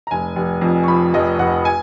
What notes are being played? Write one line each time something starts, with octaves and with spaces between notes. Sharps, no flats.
A#5
F1 G#5
F1
F2
C#6
F3 B5
F1 D#5
F1 F#5
G#5